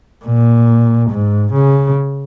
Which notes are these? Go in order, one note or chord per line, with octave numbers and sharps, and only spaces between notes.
A#2
G#2
C#3